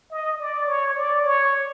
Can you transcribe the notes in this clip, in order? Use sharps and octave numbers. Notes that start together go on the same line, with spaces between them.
D#5
D5
C#5
D5
C#5